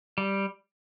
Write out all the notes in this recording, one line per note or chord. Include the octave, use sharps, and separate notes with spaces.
G3